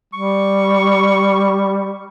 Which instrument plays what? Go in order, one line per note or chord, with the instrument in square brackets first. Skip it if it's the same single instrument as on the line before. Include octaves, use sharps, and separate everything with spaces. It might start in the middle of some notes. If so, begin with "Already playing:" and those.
[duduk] G3 [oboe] C#6